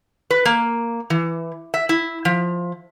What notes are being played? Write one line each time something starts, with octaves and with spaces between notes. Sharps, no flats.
B4
A#3
E3
E5
E4
F3